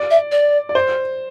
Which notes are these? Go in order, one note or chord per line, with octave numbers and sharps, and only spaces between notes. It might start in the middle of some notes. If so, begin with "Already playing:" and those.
Already playing: D5
E5
D5
D5
C5